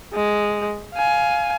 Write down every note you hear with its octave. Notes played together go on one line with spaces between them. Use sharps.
G#3
F5 G#5